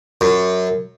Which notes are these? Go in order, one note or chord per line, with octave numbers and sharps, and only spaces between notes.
F#2